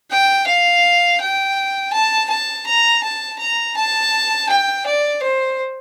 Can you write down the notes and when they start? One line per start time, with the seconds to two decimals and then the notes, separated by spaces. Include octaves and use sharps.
0.11 G5
0.47 F5
1.21 G5
1.93 A5
2.30 A5
2.66 A#5
3.03 A5
3.39 A#5
3.76 A5
4.49 G5
4.86 D5
5.22 C5